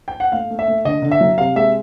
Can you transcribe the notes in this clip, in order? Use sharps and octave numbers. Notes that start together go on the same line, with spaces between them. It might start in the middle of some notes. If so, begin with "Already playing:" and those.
G5
F#5
A3 F5
A3
E5
A3
D3 D#5
D3
E5
F#3
C3 F5
G#3 E5